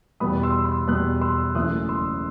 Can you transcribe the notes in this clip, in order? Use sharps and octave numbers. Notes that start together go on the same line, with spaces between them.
E2 B2 G3 B3 B5 D#6
C6 E6
C6 E6
E2 B2 G3 B3 D#6 F#6
C6 E6
F#1 F#2 E3 A3 D#6 F#6
C6 E6